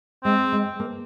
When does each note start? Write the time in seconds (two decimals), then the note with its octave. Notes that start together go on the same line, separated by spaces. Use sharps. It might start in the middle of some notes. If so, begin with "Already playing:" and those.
0.24 G#3 C4
0.52 G#3
0.80 A#3